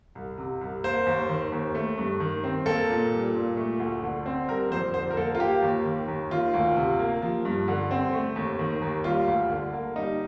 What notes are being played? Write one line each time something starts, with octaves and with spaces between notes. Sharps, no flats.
C2
C3
C2
A#3 C5
D#2
D#3
D#2
A3
G2
D#3
C4
A#3 A4
A#2
G3
A#2
A3
D2
D3
C4
G3 A#4
F2 C5
D3 C5
A#4
A#3 A4
F4
A#3 G4
D#2
D#3
D#2
D#3 F4
D2
C3
A#3
F3
G2
D3
C4
A3
D#2
D#3
D#2
G3 F4
D2
D3
A#3
G3 D#4